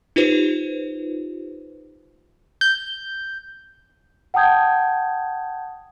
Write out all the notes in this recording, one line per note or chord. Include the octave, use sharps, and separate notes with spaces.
D#4 F4 G4 B4 C5
G6
F#5 G5 A5 D#6 G6 G#6